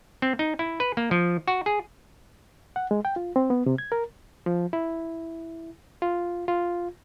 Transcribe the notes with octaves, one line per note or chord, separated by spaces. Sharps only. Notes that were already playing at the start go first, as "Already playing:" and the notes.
C4
D#4
E4
B4
A#3
F3
F#4
G#4
F#5
G#3
G5
F4
C4
B3
C3
G#6
A#4
F3
E4
F4
F4